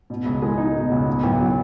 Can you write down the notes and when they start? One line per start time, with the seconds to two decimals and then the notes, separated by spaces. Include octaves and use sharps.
0.10 B2
0.26 C#2
0.42 G#3
0.58 D#4
0.75 B2
0.91 C#2
1.07 B2
1.23 B1
1.39 F#3